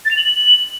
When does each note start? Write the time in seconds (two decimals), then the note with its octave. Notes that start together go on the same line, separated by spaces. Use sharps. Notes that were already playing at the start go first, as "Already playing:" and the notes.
0.05 A6
0.11 F7
0.16 F#7